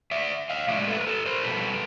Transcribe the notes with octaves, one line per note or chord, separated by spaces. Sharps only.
D5 E5
D#5 F5
A2 F3 G#3 D5 E5
A4 B4
A#4
A4 B4
A#4 C5
B2 G3 A4 B4